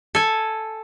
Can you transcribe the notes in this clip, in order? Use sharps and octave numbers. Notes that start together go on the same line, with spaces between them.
A4 G#5